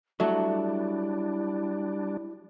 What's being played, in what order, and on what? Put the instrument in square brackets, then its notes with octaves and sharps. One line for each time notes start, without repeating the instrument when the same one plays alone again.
[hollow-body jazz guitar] F#3 [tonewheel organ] G3 D4 [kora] A3 [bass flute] E4